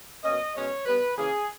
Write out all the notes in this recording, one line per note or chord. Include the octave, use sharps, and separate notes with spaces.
B2 A#3 C#4 D#5
B2 G#3 C#4 C#5
G2 G3 B3 B4
C#3 E3 A#3 C#4 G#4